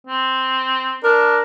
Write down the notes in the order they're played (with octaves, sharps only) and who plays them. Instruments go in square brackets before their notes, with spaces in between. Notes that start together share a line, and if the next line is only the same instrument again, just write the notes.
[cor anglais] C4
[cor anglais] D4 [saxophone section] A#4